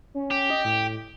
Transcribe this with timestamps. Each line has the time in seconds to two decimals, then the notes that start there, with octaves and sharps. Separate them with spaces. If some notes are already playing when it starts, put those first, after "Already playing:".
0.15 C#4
0.31 G4
0.50 D#5
0.64 A2